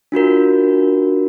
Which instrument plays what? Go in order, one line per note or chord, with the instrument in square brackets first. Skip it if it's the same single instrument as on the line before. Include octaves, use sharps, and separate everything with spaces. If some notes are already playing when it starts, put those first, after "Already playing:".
[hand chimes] D4 F4 F#4 A#4